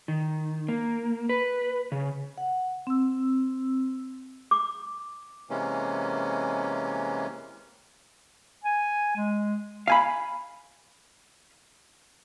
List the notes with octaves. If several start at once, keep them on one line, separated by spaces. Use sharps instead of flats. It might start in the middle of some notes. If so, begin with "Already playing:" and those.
D#3
A#3
B4
C#3
F#5
C4 E6
D6
C3 E3 G#3 A#3 C#4
G#5
G#3
F5 G#5 B5